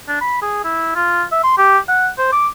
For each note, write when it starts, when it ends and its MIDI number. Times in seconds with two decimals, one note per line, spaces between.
0.08 0.19 62
0.21 0.41 83
0.42 0.63 68
0.64 0.93 64
0.95 1.23 65
1.32 1.41 76
1.44 1.55 84
1.58 1.78 67
1.88 2.09 78
2.18 2.29 72
2.32 2.48 86